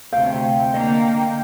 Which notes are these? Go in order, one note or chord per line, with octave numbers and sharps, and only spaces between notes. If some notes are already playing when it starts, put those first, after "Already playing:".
D2 C3 F5 G5
D3 A#3 D#5